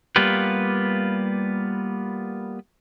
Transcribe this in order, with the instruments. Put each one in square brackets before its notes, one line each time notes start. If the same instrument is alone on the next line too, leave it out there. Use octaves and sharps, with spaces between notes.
[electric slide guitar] G3 A#3 B3 F4 G4 B4